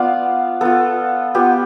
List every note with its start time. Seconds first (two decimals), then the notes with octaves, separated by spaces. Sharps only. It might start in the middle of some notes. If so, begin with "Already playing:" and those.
Already playing: B3 F4 D5 F5
0.61 B3 F4 A4
1.35 B3 F4 G4